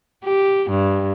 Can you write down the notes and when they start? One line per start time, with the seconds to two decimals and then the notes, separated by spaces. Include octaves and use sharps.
0.24 G4
0.71 G2